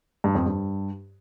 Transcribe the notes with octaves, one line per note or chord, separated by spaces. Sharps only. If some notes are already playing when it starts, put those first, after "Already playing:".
G2
F2
G2